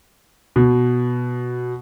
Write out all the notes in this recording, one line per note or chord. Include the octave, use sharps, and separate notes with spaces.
B2